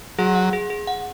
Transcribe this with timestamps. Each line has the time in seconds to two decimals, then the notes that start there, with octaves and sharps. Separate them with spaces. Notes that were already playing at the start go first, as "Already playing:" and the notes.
0.18 F#3 G#4
0.35 F#5
0.53 G#4
0.70 G#4
0.87 F#5